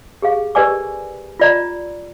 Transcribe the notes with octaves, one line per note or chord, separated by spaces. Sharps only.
G4 G#4 F5
G4 A#4 B4 D5 G#5 D6
F4 D5 A#5